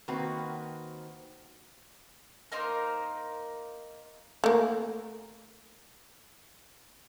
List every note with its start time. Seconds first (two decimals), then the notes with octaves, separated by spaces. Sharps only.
0.08 D#3 A#3 C4 F#4 B4
2.52 A#3 D#4 A#4 C5
4.44 A3 A#3